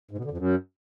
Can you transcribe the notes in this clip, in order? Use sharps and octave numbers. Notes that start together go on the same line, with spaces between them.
G#2
B2
D3
F2
F#2